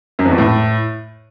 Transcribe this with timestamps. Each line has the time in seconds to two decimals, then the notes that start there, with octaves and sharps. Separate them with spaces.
0.19 F#2
0.25 F2
0.32 E2
0.38 A2